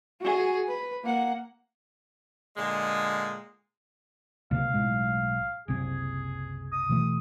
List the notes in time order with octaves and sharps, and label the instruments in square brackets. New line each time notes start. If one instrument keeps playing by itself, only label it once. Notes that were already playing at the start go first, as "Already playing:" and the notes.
[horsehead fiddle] F#4 G#4
B4
A#3 F#5
[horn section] A#2 D3 G#3
[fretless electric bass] C#2 C3 A#3 [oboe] F5
[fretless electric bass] B1 A2 G#3
[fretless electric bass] F#1 C2 C3 [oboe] G#4
[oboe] D#6
[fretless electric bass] B2 E3 A3